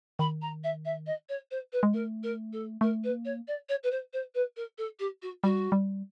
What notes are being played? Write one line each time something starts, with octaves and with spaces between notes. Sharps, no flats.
D#3 B5
A#5
E5
E5
D#5
C#5
C5
B4
G#3
A3 A#4
A#4
A4
A3 A#4
B4
A#3
C#5
D5
C#5
B4
C5
C5
B4
A#4
A4
G4
F#4
G3 F#4
G3